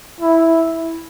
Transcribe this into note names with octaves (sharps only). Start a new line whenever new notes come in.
E4